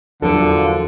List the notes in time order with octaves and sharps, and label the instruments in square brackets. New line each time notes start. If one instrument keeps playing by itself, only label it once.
[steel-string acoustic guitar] E2 F#3 [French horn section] G2 A#2 F3 [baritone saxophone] D3 [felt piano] A4